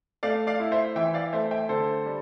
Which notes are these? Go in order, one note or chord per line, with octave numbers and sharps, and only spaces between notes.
A3 D5 F5
D5 F5
E4
C5 E5
E3 E5 G5
D5 F5
A3 C5 E5
E5 G5
D3 A4 C5
G3